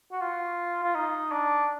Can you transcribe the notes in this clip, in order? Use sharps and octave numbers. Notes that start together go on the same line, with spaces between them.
F#4
F4
F4
D#4
D4